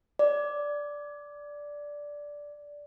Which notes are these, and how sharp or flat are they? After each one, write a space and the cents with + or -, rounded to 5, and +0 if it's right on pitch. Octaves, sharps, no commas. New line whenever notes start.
D5 -5